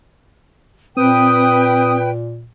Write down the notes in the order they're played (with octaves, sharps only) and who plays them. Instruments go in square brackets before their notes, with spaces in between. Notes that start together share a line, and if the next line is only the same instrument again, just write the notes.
[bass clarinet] A#2 [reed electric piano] C4 [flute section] B4 G5 [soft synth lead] D#6